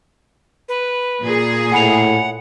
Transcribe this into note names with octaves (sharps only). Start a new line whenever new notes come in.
B4
A#2 G#4
A2 F#5 G#5 B5 F7